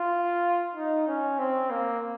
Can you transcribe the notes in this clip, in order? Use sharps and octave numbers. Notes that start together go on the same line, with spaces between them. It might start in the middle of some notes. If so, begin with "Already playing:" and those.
Already playing: F4
D#4
C#4
C4
A#3